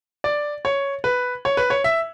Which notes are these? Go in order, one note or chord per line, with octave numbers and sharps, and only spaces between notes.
D5
C#5
B4
C#5
B4
C#5
E5